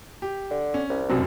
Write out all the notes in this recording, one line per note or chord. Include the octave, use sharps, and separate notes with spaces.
G4
D3
C#4
C2
F1 F#2 B2 C4